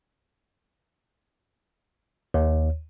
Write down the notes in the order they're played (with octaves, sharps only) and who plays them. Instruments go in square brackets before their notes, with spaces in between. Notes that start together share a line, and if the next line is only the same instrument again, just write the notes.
[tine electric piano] D#2